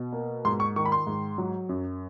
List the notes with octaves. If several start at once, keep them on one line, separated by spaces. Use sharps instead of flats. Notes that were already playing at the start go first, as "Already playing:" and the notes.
Already playing: B2
A#3
G#2 C6
C#6
D#3 C#6
B5
C6
G#2
F#3
F#2